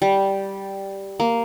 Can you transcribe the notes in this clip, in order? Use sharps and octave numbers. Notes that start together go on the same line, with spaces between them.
G3
A#3